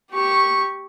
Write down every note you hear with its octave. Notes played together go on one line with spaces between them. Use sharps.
G4 C#6